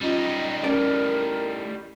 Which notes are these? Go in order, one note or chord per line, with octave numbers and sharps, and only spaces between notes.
G3 C#4 D#4 F4 D#5
A2 C#4 A#4 D5